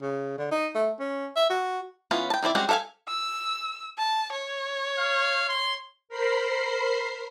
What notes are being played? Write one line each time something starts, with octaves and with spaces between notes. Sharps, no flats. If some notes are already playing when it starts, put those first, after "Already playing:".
C#3
D3
D#4
A3
C#4
E5
F#4
E3 B3 C#4 F4
G5 A5
D#3 C4 E4 D5
G3 G#3 C4 C#4 F#4
A4 A#4 E5 F5 G#5
E6
A5
C#5
F5
C6
A#4 C5 B5 C7